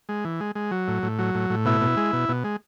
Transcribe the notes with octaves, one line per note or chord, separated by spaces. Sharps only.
G#3
E3
G#3
G#3
F#3
A2
A2
F#3
A2
A2
B2 E4
B2
G#3
B2
B2
G#3